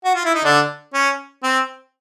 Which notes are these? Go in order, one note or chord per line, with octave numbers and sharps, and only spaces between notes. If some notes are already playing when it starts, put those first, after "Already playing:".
F#4
F4
E4
D#4
D3 D4
C#4
C4